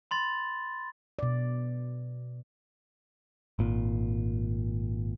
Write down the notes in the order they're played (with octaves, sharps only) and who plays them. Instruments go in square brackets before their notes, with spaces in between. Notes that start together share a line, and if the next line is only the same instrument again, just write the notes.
[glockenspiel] B5 C6 A6
[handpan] B2 D5
[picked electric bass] G#1 A#2